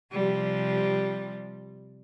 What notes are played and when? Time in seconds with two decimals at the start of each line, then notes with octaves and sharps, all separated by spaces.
0.12 C3 F3 G3